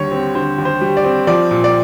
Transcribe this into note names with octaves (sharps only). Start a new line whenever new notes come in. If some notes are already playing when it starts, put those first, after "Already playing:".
Already playing: D#2 D3 G3 C#5
C4
D3 C5
D#2
C5
G3
D5
C4
F3 D5
A#2
D5